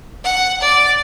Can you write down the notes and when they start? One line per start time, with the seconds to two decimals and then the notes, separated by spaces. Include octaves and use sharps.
0.24 F#5
0.61 D5